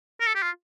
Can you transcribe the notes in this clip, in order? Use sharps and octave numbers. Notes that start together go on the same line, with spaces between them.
A#4
A4
G4
F4